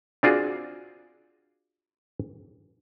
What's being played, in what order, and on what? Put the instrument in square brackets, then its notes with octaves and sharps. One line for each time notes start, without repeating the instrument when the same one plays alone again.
[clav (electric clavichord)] C4 D4 F4 F#4 G#4